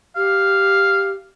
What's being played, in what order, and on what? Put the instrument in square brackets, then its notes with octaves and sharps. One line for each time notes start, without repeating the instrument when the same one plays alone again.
[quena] G4 [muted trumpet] F5